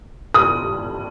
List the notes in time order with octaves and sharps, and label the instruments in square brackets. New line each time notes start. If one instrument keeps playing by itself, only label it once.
[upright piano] D#6